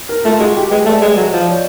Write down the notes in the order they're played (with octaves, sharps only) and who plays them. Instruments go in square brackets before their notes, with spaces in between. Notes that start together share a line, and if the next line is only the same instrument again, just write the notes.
[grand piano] A#4
[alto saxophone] A3 [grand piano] F4
[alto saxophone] G#3 [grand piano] F#4
[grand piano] G4
[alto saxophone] G#3 [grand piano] B4
[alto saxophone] A3 [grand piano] D5
[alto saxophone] G#3 [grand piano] E5
[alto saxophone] F#3 [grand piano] D#5
[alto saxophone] F3 [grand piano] D#5
[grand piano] D5
C#5